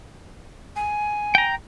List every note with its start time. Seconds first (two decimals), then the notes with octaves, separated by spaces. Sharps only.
0.76 G#5
1.35 G5 A#5